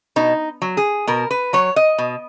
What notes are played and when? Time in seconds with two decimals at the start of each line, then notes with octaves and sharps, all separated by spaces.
0.16 B2 D#4
0.62 F#3
0.77 G#4
1.07 B2 A#4
1.31 B4
1.53 F#3 C#5
1.76 D#5
1.98 B2